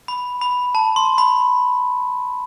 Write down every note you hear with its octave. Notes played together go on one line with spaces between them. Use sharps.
B5
B5
A5
C6
B5